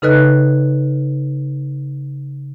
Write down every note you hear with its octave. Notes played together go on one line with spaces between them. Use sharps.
C#3 D#4 A4 B4 D#5 F#6